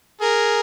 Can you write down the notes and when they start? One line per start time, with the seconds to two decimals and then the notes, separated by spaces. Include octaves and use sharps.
0.21 G#4 A#4